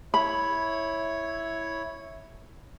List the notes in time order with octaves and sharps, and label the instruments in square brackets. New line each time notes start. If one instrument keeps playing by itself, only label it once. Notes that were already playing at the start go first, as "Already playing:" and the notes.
[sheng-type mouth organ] E4 C#5 [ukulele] B5